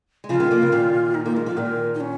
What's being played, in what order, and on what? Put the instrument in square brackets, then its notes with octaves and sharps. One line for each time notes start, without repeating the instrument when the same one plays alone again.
[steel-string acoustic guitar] G#3
[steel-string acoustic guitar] C#3 F3 [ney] F4
[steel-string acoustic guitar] D#3 G#3
F3 A#3
C#3 F3
A#2 D#3
[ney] D#4
[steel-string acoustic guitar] A#3 [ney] D#4
[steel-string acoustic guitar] G#3 [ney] F4
[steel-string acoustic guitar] F3 [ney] F4
[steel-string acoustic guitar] A#2 D#3 [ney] A#4
[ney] D#4
C#4